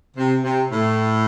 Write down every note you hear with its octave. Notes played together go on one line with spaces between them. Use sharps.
C3
C3
A2